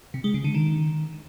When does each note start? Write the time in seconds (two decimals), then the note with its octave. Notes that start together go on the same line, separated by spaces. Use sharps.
0.14 C3
0.24 G#3
0.34 C#3
0.44 D3
0.55 D#3